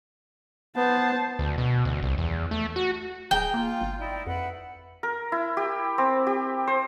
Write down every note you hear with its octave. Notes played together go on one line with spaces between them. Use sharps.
B3 C5 A5
D2
B2
D2
C2
E2
A3
F#4
D1 G#4 G5 A#5
A#3 F4
G1
D#4 E4 D5
F2 B4 E5 F#5
A#4
E4
G4
C4
G4
C5